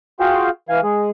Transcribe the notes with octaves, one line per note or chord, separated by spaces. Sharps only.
F4 F#4 G#4 F5 G5
E3 F5 G#5
G#3 G#4